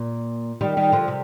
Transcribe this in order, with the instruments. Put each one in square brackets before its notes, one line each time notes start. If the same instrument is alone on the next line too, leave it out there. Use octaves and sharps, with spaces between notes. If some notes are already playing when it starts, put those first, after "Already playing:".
Already playing: [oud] A#2
D#3 G3
D#3 G3
D3 F3
C3